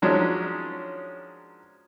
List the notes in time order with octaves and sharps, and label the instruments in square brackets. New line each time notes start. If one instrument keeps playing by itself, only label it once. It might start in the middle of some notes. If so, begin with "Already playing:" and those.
[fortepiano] D#3 F3 F#3 G#3 C#4 D4